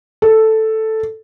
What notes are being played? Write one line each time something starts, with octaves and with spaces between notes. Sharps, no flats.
A4